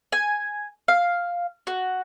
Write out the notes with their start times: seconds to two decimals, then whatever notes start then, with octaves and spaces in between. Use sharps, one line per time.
0.12 G#5
0.88 F5
1.67 F#4